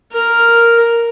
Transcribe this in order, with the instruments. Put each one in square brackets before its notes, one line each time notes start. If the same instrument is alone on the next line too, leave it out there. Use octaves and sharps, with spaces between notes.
[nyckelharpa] A#4